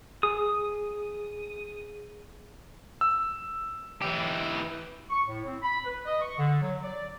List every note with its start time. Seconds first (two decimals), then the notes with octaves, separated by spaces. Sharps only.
0.23 G#4 D#6
3.01 E6
4.01 E3 G4
5.10 C#6
5.27 A2
5.45 C4
5.62 B5
5.85 B4
6.06 D#5
6.21 C#6
6.38 D3
6.62 F#3
6.83 D5